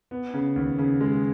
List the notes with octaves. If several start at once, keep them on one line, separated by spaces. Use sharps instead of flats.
B3
C#3
D#2
C#3
G#3